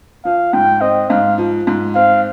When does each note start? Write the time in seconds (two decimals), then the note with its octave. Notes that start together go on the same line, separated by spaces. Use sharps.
0.25 F3 F5
0.53 G#2 G5
0.81 C4 D#5
1.10 G#2 F5
1.38 F3
1.67 G#2
1.95 C4 F5